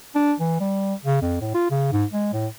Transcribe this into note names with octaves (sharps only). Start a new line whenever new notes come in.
D4
E3
G3
C#3
F2
A2
F4
C#3
G#2
G#3
A2